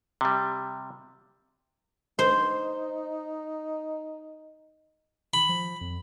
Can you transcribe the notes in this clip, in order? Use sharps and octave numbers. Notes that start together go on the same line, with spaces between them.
C3 G3
D#4 C5
B5
F3
F2